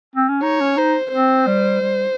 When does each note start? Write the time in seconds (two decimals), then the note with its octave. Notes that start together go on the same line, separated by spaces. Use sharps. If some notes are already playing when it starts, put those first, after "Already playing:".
0.16 C4
0.29 C#4
0.42 D#4 C#5
0.61 C#4
0.77 D#4 C5
1.12 C4 C5
1.47 G3
1.81 G3